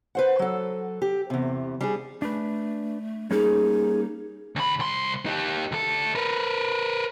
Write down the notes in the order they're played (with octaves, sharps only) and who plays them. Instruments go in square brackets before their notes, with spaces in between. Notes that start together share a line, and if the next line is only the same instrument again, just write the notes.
[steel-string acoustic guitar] B4 C5 F#5
F#3 A4
G4
E2 C3
G3 D4 G#4
[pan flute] A3 [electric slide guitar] D4 B4
[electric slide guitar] G3 A#3 C#4 [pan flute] D#4 [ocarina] G#4
[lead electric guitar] D2 B5
C2 C6
D#4 G4
D2 A4
A#4 B4